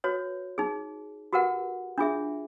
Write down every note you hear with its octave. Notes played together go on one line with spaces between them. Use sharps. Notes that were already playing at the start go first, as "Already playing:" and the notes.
F#4 B4 C#5
D#4 G#4
F#4 G4 A#4 B4 F#5
D4 F4 G#4 E5